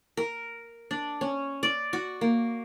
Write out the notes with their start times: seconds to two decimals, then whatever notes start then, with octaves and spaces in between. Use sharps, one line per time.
0.17 A#4
0.91 D4
1.21 C#4
1.63 D5
1.93 F#4
2.21 A#3